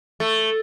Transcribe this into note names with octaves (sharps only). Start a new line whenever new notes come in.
A3